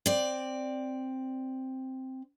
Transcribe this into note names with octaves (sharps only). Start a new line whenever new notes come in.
C4 D5